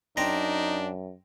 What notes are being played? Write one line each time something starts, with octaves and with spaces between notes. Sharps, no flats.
F#2 C4 D4 D#4 A#5